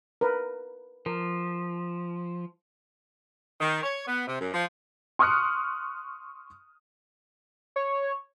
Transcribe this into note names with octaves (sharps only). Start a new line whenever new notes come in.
A#4 B4
F3 A#4
D#3
C#5
B3
C3
F#2
F3
C6 C#6 D#6 F6 F#6 C#7
C#5